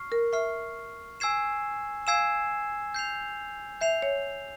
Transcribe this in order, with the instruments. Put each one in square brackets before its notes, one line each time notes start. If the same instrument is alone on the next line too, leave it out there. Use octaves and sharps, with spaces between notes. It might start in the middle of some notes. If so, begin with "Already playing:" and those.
Already playing: [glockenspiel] C#6 F6 C7
[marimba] A#4
[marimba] E5 [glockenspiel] C#6 F6 C7
[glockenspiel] G#5 E6 G#6 C7 E7
[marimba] F5 [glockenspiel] G#5 E6 G#6 C7 E7
[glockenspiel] G6 C7 F7
[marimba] E5 [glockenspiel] G6 C7 F7
[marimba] C#5